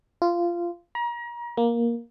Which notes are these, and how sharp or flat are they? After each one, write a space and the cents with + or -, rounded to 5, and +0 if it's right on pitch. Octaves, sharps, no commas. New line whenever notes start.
F4 -15
A#5 +35
A#3 +10